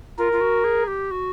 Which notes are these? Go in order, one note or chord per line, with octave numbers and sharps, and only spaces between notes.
F4 A#4
F4
F#4
G#4
G4
F#4